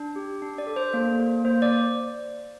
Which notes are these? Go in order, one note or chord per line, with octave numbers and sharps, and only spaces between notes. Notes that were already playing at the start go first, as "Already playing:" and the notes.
Already playing: D4
G4
D4
D5
A4
C5
A#3
A#3
A#3 C5
D5